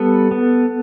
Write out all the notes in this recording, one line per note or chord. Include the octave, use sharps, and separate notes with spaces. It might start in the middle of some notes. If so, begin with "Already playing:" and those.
Already playing: G3 B3 A4
B3